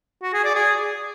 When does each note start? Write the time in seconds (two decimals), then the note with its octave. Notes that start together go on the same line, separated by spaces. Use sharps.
0.22 F#4
0.33 G#4
0.44 D5
0.55 G#4